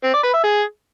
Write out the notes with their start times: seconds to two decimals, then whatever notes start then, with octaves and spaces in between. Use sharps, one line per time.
0.04 C4
0.14 D5
0.23 B4
0.33 E5
0.43 G#4